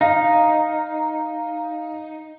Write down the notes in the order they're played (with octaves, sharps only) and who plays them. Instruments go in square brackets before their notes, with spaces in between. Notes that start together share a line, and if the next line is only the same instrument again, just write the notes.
[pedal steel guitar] D#4 [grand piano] F5